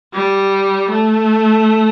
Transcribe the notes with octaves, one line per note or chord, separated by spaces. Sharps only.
G3
A3